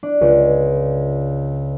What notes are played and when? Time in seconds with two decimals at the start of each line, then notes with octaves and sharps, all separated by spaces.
0.03 D4
0.21 C#2